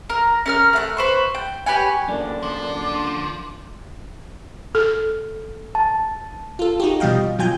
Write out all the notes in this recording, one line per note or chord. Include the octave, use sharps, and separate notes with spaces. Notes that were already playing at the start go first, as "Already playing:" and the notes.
A#4
C#4 A#4 F6
A3 F#5 F#6
B4 C5 C#6
G5
G4 B4 C#5 G#5
F#2 D3 A#3 D4
F3 D6
A4
A5
F4 A4
D#4 F#4 G4
B2 F3 G3 D#5 F5 G5
B2 F#3 F4 G5 G#5 G6